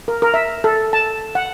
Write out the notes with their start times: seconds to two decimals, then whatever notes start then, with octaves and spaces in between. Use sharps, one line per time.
0.08 A#4
0.22 A#4
0.34 E5
0.64 A4
0.93 A5
1.35 F#5